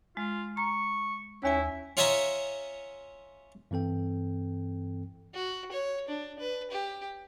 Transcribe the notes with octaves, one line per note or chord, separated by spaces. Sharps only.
G#3 F4
A#5 C#6
D#2 C#4 E4 E5 G#5
C#4 F4 C#5 D#5 E5 A#5
G2 E3 C4 A4 G5
F#4
C#5
D4
B4
G4